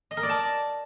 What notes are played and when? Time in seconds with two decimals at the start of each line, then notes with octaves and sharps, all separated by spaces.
0.11 D#5
0.17 A#4
0.23 D5
0.29 A5